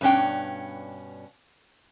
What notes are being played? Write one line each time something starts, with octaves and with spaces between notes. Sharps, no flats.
G2 B2 C#4 D4 G5